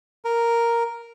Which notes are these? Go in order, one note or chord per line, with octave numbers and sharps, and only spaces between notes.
A#4